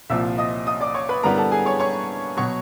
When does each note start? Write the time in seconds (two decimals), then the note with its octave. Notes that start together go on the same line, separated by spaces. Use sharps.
0.10 C2 A#2 F3 E5 E6
0.38 D#5 D#6
0.67 D#5 D#6
0.81 D5 D6
0.94 C#5 C#6
1.09 B4 B5
1.23 G2 D3 G3 B3 E4 A#4 A#5
1.37 A4 A5
1.51 G#4 G#5
1.66 C#5 C#6
1.80 C#5 C#6
2.37 B2 F#3 C#5 C#6